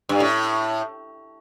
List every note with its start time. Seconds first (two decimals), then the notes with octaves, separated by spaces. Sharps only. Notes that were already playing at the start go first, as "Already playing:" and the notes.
0.09 G2
0.20 A2